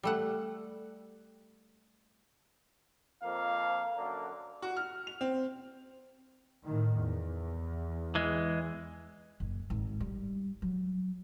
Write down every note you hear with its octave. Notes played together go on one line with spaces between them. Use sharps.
G3 A3 F#5
F2 A#3 F5
F#2 D3 A#3
F#4
F6
F7
C4
A2 D#3
E2
E3 G#3
F#1
G#1
G3
F#3